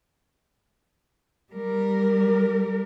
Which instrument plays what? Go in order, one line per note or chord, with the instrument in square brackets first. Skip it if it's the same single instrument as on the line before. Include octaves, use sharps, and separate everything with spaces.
[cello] G3 A#4